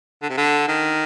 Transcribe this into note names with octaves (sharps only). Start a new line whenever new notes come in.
D3
C3
D3
D#3